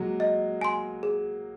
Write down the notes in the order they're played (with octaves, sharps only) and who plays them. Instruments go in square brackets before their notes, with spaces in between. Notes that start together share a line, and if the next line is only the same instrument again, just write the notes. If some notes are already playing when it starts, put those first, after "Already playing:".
Already playing: [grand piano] F#3 G#3 A#3
[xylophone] D#5
G#5 C6
G#4